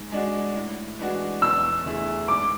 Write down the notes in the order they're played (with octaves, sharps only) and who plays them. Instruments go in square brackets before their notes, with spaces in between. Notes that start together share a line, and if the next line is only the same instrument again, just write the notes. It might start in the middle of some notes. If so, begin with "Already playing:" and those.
Already playing: [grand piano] G#2
G#3 D4 F#4
A2
E3 G#3 D4 F#4
[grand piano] E2 [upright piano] E6
[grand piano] D3 A3 E4 G#4
[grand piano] G#2 [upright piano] D6